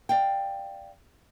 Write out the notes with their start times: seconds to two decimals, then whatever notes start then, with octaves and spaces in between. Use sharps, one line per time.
0.09 D5 F5 G5